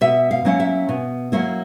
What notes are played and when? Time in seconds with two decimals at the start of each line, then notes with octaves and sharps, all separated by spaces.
0.01 B2 E5
0.31 F5
0.45 F#3 A#3 C#4 E4
0.60 E5
0.89 B2
1.32 F#3 A#3 C#4 E4